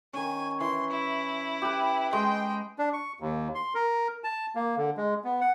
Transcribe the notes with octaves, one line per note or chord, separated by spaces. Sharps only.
D#3 C#4 G#5
E3 C6
E4
G4 B4
G#3 D#5 G5 C6
D4
C#6
D#2
C6
A#4
A5
A#3
D3
G#3
B3
F#5